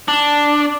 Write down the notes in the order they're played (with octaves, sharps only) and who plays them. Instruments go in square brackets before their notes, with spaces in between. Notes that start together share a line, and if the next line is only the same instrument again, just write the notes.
[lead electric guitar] D4